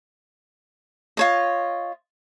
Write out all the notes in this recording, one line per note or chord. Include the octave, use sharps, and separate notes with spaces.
F4 C#5 D#5